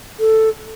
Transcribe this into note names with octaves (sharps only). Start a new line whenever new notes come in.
A4